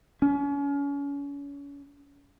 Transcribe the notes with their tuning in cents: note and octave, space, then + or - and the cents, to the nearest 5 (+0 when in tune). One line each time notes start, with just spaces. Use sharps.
C#4 +35